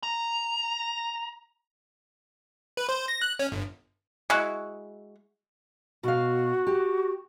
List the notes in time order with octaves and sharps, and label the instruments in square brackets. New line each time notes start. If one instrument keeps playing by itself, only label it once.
[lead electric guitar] A#5
[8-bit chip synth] B4
C5
A#6
F#6
C#4
G1
[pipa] G#3 E4 F#4
[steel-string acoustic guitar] B2 F5 [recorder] F#4
[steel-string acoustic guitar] G4